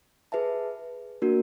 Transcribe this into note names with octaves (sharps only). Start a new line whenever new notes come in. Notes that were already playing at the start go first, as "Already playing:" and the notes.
G#4 B4 E5 A5
A#3 D4 F#4 A#4